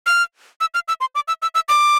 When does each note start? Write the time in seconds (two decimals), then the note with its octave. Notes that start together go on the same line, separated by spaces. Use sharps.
0.06 F6
0.61 E6
0.74 F6
0.88 E6
1.01 C6
1.15 D6
1.28 E6
1.42 E6
1.55 E6
1.69 D6